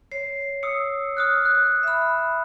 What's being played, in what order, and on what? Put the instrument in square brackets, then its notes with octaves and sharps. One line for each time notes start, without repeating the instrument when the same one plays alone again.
[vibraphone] C#5 [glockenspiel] C7
[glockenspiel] D#6 E6 C#7
D#6 F6 F#6
F#6
[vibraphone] E5 B5